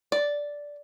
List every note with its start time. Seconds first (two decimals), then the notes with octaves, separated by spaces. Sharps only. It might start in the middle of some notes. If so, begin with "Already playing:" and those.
0.12 D5